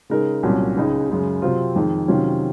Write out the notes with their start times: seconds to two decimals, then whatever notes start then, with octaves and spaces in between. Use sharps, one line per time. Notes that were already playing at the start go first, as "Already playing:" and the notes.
0.10 C#3 G#3 D#4 A#4
0.43 C2 A#2 F#3 C#4
0.76 C#2 C#3 G#3 D#4 G#4
1.09 F#2 C#3 G#3
1.42 C3 F#3 C4 F4
1.76 F2 D#3 G#3 D#4
2.08 C3 D#3 F#3 C#4 F4